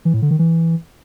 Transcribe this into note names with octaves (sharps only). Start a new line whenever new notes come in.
E3
A2
D3
D#3
E3